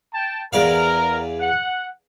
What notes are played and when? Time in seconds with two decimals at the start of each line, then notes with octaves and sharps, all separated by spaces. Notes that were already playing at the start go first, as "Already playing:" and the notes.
0.14 G5 A5
0.53 E2 A#4 D5 F5
1.40 F#5